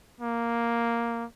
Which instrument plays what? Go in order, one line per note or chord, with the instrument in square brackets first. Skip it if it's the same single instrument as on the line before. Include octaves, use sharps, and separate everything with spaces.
[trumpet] A#3